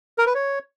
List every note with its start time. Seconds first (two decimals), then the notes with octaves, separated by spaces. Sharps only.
0.18 A#4
0.26 B4
0.35 C#5